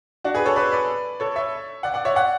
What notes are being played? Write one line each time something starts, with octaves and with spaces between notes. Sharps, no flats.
D4 F#4
G#4 B4
A4 C#5
B4 D5
B4 D5
A4 C#5
C#5 E5
D5 F#5
D5 F#5
C#5 E5
D5 F#5